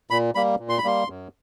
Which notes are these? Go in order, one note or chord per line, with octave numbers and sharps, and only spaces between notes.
A#2 B5
G3 A#3 B5
A#2
C6
B5
G3 A#3 C6
F#2